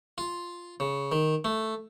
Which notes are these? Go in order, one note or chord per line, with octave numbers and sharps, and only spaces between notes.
F4
C#3
D#3
A3